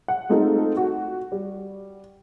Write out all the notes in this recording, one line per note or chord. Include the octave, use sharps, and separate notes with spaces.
F#5
G#3 A3 C4 D#4 F4 A4
F#4
G3